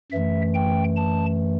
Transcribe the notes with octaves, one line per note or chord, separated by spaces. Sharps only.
F#2 E3 A3 E5
G5
A5